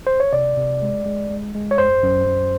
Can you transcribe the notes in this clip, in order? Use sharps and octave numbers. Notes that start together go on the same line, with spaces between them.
C5
C#5
C3 D5
C3
G#3
G#3
G#3
G#3
C#5
F#2 C5
F#2
F#2